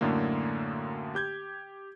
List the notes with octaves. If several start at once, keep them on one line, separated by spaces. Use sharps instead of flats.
F#2 A2 D3 A3 A#3
G4 G6 G#6